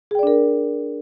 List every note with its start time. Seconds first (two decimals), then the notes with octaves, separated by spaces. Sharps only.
0.11 G#4
0.15 G5
0.19 D5
0.23 D4
0.27 A#4